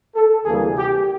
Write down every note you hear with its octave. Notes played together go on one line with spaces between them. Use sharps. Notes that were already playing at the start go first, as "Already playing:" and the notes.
A4
D2 C3 E3 G3 A#3 G#4
G4